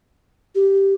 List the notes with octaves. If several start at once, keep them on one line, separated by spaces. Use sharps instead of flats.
G4